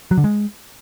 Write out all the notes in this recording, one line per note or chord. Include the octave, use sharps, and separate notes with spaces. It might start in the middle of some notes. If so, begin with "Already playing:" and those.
F#3
D3
G#3